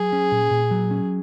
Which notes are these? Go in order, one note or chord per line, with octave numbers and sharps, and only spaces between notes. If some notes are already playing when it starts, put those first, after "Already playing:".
Already playing: F#3 G#4
C#4
A#2
A#2
F#3
C#4